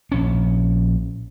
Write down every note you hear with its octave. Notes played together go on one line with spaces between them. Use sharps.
A#1 C#4